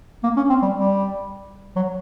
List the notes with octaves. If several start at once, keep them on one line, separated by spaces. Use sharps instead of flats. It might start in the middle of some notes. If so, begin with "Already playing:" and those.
A#3
C#4
C4
G3
G3
F#3